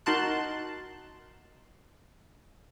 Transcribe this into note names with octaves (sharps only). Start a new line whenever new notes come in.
D#4 F#4 A#4 A5 C6 F#6